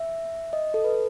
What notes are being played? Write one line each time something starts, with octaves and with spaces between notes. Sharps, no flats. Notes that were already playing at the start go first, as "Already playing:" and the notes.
Already playing: E5
D#5
A4
B4